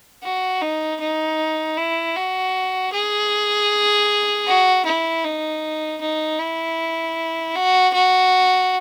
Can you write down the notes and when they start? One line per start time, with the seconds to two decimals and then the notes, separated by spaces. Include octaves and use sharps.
0.23 F#4
0.61 D#4
1.00 D#4
1.77 E4
2.16 F#4
2.93 G#4
4.47 F#4
4.85 E4
5.24 D#4
6.01 D#4
6.39 E4
7.55 F#4
7.94 F#4